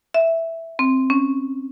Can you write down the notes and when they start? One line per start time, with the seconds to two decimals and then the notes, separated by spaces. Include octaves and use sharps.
0.14 E5
0.79 C4
1.10 C#4